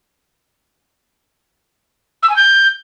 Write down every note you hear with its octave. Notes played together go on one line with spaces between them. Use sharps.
E6
G#5
G6